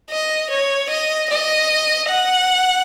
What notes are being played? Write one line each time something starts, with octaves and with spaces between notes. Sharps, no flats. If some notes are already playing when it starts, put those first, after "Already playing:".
D#5
C#5
D#5
D#5
F#5